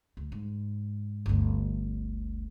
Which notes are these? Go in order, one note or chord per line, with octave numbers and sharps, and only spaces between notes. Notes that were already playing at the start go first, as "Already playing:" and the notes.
D2
G#2
G1 D2